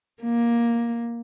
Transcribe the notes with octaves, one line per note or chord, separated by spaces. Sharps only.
A#3